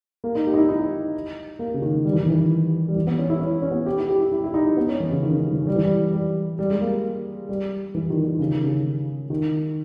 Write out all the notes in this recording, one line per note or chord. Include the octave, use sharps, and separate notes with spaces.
A#3
D#4
G4
D#4
E4
D#4
A#3
C#3
D#3
G3
E3
D#3
E3
G3
E3
B3
C#4
E4
C#4
C#4
B3
G4
E4
G4
E4
E4
E4
D#4
B3
C#4
E3
C#3
D#3
C#3
D#3
E3
G3
E3
G3
G3
G3
G#3
A#3
G3
E3
D#3
D#3
C#3
D#3
C#3
D#3